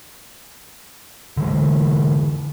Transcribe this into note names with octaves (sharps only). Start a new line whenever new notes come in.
D3 E3 G#3